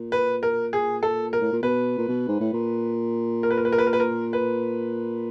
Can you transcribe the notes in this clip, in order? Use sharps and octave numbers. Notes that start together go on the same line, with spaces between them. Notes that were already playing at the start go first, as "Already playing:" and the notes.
Already playing: A#2
B4
A#4
G#4
A4
A#4
A2
A#2
B2 B4
A#2
B2
G#2
A2
A#2
A#4
B4
A#4
B4
A#4
B4
A#4
B4
A#4
B4